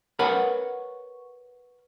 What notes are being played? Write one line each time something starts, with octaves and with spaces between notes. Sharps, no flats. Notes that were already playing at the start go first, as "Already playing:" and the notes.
A#4 B4 C#5 F#5 B5